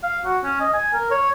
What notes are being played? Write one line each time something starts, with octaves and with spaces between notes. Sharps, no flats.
F5
F#4
C#4
D#5
G#5
A#4
C#5